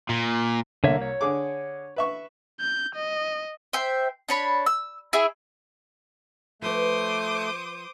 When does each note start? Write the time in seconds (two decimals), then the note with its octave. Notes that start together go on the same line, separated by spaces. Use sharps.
0.09 A#2
0.84 C2 D3 A#3 C#5 E5
1.02 C#5
1.21 D3 G#4 D6
1.96 B4 E5 C#6
2.60 G6
2.95 D#5
3.73 C5 E5 G5
4.29 D4 C#5 B5
4.66 E6
5.13 E4 G#4 E5
6.62 F3 A3 B4 C5 D6 D#6